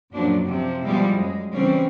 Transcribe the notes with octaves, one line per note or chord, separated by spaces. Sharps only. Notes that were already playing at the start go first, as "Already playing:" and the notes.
F#2 A#2 F3 F#3 D4
C3 F3
B2 F3 G3 G#3 E4
F#2 G#3
C#3 E3 G3 C4 C#4